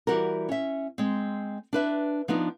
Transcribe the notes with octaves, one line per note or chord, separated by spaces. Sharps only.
E3 G3 F#4 G4 A#4
C#4 E5
G#3 C4
D4 B4 E5
F3 B3 D4 D#4